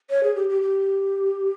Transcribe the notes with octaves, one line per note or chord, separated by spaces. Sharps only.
C#5
G#4
G4
G4
G4